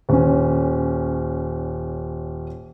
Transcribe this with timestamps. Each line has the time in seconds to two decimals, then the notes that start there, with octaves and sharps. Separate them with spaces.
0.09 D#1 C#4